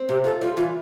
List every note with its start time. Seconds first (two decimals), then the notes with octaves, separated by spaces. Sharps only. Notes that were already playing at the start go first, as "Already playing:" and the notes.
Already playing: C4
0.09 C3 G4
0.24 F4 A4
0.41 G3 F4
0.57 E3 F4